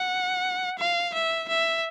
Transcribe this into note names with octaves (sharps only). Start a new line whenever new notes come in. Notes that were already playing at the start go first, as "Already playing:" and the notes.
Already playing: F#5
F5
E5
E5